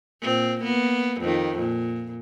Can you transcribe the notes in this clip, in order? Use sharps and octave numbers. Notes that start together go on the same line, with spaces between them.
A#2 C4
A#3 B3
F2 D#3
A#2